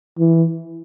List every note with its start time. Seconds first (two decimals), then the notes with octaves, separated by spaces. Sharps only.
0.19 E3